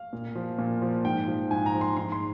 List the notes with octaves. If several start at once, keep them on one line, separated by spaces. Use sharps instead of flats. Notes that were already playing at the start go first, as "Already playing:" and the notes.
Already playing: F5
A#2
F3
A#2
F3
G#2 G5
F3
G#2 G#5
A#5
F3
C6
G#2 C6
C6